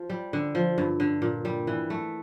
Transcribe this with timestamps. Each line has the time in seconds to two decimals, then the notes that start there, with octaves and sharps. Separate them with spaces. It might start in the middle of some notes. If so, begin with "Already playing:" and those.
Already playing: F3
0.10 G3
0.33 D3
0.55 F3
0.78 G2
1.00 D3
1.22 A#2
1.45 G3
1.67 E3
1.90 A3